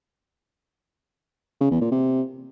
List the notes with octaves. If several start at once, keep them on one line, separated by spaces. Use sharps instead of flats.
C#3
E2
A#2
C3